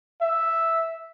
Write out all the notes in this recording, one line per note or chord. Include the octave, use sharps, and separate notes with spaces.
E5